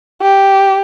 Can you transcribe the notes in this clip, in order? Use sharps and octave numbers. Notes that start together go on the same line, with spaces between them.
G4